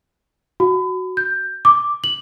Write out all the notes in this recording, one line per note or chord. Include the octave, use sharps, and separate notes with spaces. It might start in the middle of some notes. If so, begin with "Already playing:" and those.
F#4
G6
D6
F#7